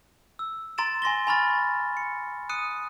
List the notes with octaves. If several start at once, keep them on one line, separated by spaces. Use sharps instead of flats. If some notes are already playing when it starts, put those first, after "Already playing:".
E6
A#5 C6 A6 D7 E7
G#5 C6 A#6 G7
G#5 A#5 B5 C#6 F6 A6
C#7
D#6 F#6 C#7 D#7